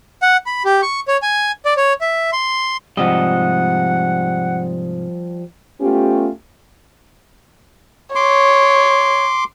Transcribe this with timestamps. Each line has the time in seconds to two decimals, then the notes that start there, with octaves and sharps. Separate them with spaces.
0.22 F#5
0.46 B5
0.65 G4
0.82 C#6
1.08 C#5
1.22 G#5
1.65 D5
1.77 C#5
2.01 E5
2.33 C6
2.97 G#2 C3 F3 G3 D#5 F#5
5.80 A3 B3 C#4 F4 G4
8.15 C#5 C6 D6